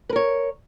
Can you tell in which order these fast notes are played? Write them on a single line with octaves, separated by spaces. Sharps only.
B4 A#4 C#5